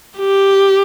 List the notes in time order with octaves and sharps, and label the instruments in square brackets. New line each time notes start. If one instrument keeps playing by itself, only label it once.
[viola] G4